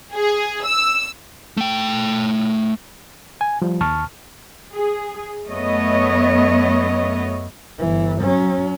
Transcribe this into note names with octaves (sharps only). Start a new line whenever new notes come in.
G#4
E6
A3 G5
G#5
F3 G3
D#2 A5 C#6 F6
G#4
F#2 A3 B3 C#5 D#5
G1 E3
F#3 C#4